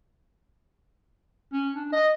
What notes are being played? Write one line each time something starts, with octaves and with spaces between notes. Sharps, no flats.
C#4
D4
D#5